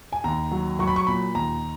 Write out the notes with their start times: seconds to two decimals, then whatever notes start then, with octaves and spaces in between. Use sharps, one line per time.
0.13 G#5
0.24 D#2 A#5
0.51 F#3
0.79 F#3 C#6
0.87 B5
0.96 C#6
1.07 A#2 B5
1.35 D#2 A#5